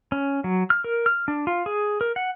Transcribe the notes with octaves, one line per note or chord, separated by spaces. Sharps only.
C#4
F#3
F6
A#4
F6
D4
F4
G#4
A#4
F#5